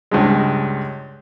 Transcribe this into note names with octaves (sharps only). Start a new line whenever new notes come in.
C#2 G2 G#3